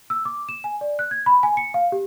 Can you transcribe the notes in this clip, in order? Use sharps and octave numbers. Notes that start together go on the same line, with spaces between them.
E6
D6
E7
G#5
D5
F#6
G#6
B5
G#5
C#7
F5
G4